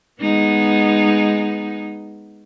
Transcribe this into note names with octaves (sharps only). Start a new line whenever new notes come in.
G#3 B3 D#4